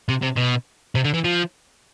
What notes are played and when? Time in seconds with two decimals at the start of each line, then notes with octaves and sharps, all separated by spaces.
0.09 C3
0.23 C3
0.37 B2
0.95 C3
1.05 D3
1.14 E3
1.24 F3